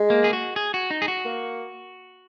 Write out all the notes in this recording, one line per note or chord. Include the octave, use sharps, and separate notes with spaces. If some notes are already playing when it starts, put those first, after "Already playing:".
Already playing: G#3
A#3
G#4
F#4
G#4
F#4
D#4
G#4
F#4
A#3